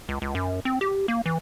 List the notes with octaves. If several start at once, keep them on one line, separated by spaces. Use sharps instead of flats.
C#2
C#2
F#2
C4
G4
A#3
E3